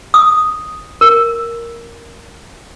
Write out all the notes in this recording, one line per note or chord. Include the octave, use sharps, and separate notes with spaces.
D#6
A#4